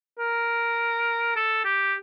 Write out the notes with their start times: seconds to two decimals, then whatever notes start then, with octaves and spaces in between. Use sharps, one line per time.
0.19 A#4
1.36 A4
1.65 G4